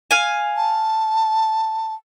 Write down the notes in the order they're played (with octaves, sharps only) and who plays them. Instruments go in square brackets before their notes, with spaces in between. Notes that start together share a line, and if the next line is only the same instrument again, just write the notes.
[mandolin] F5 G#5
[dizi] A5